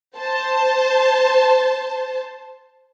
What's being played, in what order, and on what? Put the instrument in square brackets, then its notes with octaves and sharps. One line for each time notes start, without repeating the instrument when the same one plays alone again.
[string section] C5 A5